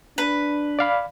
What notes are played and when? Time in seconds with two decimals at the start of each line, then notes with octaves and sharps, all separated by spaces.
0.18 D4 B4
0.79 D5 F5 B5